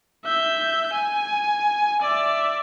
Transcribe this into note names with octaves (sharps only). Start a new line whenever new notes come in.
E5 G6
G#5
D5 E5